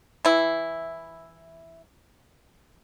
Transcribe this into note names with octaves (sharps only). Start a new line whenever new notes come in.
E3 E4